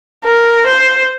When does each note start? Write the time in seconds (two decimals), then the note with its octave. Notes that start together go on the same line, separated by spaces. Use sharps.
0.24 A#4
0.66 C5